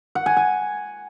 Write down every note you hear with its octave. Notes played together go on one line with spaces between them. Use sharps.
F#5
G#5
G#5